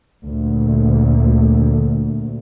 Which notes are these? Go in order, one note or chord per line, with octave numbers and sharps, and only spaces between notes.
D2 A#2